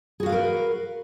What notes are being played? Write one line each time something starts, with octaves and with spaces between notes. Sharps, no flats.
F#4 G#4 A#4 B4 F5